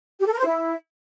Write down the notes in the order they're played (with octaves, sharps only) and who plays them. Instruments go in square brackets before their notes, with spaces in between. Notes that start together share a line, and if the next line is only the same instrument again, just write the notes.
[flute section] G4
A4
A#4
C5
E4